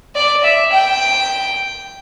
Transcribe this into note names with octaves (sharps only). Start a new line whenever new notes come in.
D5
E5
G5